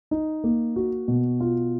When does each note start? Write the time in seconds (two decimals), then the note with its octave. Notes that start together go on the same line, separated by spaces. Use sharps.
0.11 D#4
0.44 A#3
0.76 F#4
1.08 B2
1.40 F4